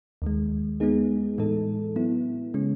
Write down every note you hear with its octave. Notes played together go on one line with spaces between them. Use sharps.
D#2 D#3 G#3
G#3 B3 D#4 G#4
A2 E3 G#3 D#4 A4
F#3 B3 E4
C#3 G#3 C#4